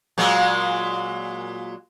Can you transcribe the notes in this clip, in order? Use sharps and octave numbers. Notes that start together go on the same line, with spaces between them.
A#2 F#3 G#3